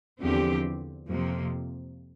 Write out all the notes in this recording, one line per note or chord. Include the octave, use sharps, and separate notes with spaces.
E2 D3 F3 C4 G4
F2 C3 F3 A#3